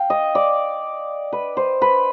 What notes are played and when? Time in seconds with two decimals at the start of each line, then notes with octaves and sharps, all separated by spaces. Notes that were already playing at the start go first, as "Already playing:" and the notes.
Already playing: F5 G5
0.10 D#5
0.35 D5
1.32 B4
1.57 C5
1.82 B4